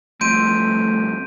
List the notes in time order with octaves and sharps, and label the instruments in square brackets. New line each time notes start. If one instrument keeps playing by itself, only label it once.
[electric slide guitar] G2 F3 C4 [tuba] A3 [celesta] C6 [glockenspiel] G6 D7 D#7